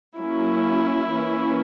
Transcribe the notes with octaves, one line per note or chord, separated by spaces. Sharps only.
F#3 A#3 C#4 E4
E3 A#3 C#4